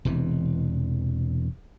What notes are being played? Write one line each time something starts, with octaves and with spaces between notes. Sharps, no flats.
E1 C3 E3